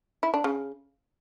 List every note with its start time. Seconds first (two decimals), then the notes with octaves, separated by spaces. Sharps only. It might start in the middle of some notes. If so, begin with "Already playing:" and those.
0.23 E4
0.34 D4
0.44 C#3